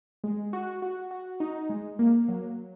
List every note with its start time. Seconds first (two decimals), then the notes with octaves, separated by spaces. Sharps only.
0.24 G#3
0.53 F#4
0.82 F#4
1.11 F#4
1.40 D#4
1.69 G#3
1.99 A#3
2.28 F#3